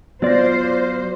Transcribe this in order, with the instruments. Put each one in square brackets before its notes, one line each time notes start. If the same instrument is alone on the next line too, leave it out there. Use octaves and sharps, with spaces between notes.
[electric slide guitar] F#3 D5 [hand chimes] B3 A#6 [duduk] F4 [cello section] C5